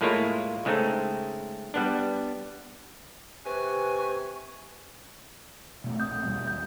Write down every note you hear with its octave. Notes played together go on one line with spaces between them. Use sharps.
A2 G#3 A#3 E4 F4 C#5
C#3 G#3 A3 C4 D#4
G3 B3 D4
C3 B4 G#5 C#6
B2 A3 C4
A#1 C4 D#6 G6
D#2 B2 G3
G6